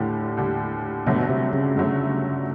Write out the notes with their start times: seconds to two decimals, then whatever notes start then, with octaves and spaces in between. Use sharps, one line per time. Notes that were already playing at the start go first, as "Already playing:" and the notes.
Already playing: D#2 A2 D3 G3
0.37 D#2 D3 G3
1.06 G2 B2 D3 F#3 A3
1.29 C3
1.53 C#3
1.75 G2 D3 F#3 A3